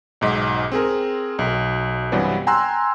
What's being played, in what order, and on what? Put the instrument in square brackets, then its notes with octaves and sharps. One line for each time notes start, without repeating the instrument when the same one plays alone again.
[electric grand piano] B1 G#2 D#5 B6
C4 G#4 A#4
B1
G2 C3 E3 F#3 G3 B3
G5 G#5 A#5 C6 E6 F#6